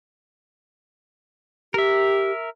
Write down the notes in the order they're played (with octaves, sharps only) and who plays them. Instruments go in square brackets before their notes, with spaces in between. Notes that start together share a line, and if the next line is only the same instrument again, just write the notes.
[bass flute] G4 [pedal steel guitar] A#4 E5